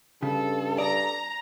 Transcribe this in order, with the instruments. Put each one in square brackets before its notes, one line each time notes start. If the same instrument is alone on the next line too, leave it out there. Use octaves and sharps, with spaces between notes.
[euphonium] G2 [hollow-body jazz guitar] C#3 [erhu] A4
[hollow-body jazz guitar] D5 [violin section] A#5